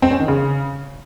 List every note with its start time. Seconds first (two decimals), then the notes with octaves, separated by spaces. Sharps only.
0.02 C4
0.11 C#4
0.20 D#3
0.28 C#3